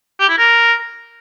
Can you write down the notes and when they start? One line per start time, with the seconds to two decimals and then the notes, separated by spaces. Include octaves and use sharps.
0.20 G4
0.29 E4
0.38 A#4